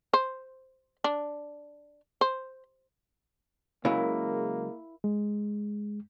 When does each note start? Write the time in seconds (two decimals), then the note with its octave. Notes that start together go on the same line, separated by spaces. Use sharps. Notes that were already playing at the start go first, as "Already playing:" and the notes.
0.13 C5
1.04 D4
2.21 C5
3.85 C#3 F#3 G#3 A#3 E4 A#4 F5
5.04 G#3